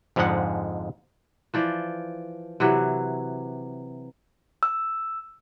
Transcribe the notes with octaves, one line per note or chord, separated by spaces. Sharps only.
F2 G#2 D3 F3 G#3 F#5
E3 F3 D5
C3 E3 F#3
E6